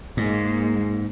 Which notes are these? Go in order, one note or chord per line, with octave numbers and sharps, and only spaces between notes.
G#2 G#3 A#3